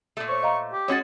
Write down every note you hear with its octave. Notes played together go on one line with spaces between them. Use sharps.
A#2 A3
C5 C#5 C#6
D#5 F5 A#5
G4
G#3 C#4 F#4 C#5 A6